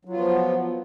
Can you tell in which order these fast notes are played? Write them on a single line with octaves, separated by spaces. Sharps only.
F#3 F4 B3 F3